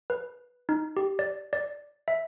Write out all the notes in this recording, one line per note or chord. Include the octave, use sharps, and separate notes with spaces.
B4
D#4
G4
D5
D5
E5